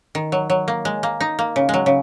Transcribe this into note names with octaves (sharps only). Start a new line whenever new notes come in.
D#3
F#3
F#3
A#3
G#3
A#3
D#4
A#3
C#3
F#3 G#3
C#3